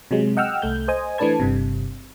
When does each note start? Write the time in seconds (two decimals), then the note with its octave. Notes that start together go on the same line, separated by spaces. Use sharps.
0.11 C3 F#3 G#3
0.37 D#5 F#5 G5 E6 F6
0.62 C2 A3 G6
0.88 C5 D#5 G#5
1.18 E3 A3 D4 B4 A5 G#6
1.40 G1 G2 C3